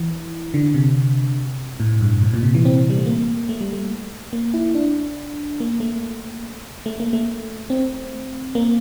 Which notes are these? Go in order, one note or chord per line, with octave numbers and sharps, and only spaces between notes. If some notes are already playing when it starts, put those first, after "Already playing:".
Already playing: E3
D3
C3
A2
G2
A2
A#2
C3
E3
C4
G3
A3
A#3
A3
G3
A3
A#3
E4
D4
A#3
A3
A3
A#3
A3
C4
A#3